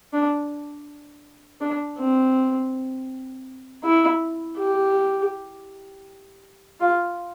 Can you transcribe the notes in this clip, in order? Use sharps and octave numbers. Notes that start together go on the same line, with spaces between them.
D4
D4
C4
E4
G4
F4